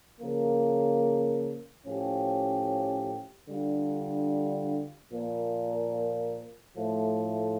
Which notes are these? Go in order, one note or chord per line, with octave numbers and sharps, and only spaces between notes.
C#3 F3 A#3
A2 F3 C#4 G4
D3 G3 D4 F4
A#2 F3 A#3
A2 F3 A3